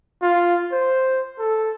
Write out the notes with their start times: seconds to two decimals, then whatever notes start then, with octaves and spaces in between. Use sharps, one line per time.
0.22 F4
0.72 C5
1.39 A4